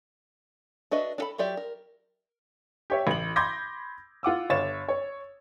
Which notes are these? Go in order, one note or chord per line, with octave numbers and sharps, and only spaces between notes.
D4 F#4 B4 D#5 E5
D4 A4 B5
F#3 F4 G4 D5 E5
A#4
G4 C#5 E5
A1 F#7
B5 C6 D6 G6 G#6 A#6
F4 F#5 D6 E6
G1 C#5 F5 A6 E7
C#5